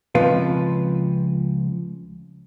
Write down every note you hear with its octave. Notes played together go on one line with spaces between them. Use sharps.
C#2 F3 C4 C#4 B4 F5